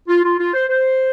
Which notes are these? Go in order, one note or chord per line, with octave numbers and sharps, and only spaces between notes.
F4
F4
F4
C5
C5